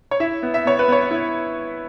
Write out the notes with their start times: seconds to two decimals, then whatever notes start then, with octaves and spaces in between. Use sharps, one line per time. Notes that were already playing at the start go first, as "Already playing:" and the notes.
0.11 C#5
0.20 E4 E5
0.43 B3
0.54 E5
0.66 B3 C#5
0.79 B4
0.88 B3 C#5
1.11 E4